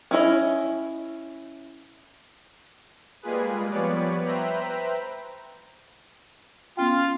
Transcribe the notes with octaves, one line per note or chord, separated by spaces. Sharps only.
C#4 E4 D#5
G3 G#3 A#3 F4 G#4 B4
F3 G3 B3 B4 C#5 D5
B4 C5 E5 G5 A#5 B5
B3 C#4 F4 G5